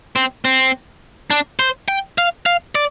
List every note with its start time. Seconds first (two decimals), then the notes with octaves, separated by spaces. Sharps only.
0.16 C4
0.45 C4
1.30 D4
1.59 C5
1.88 G5
2.18 F5
2.46 F5
2.75 D5